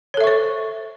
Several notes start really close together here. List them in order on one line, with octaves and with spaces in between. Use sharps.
C#5 A4 E5 C#6 C5